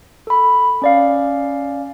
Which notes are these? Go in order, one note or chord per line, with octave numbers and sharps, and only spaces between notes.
A4 B5
C#4 D5 F5